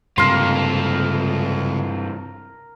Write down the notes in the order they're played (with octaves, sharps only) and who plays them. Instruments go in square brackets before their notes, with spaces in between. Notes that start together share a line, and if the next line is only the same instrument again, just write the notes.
[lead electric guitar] C#2 [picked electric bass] G2 C3 [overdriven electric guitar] F4 A4 [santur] A#4 C6